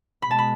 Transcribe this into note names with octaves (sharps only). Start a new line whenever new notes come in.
B2 G#3 B5
A5
B5